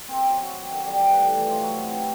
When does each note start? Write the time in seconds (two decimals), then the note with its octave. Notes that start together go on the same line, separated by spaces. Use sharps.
0.08 C4
0.29 F#3
0.42 F#4
0.71 D#3
0.86 G3
1.01 B4
1.18 A2
1.32 E3
1.46 F3
1.63 F#3
1.82 C3
1.97 E4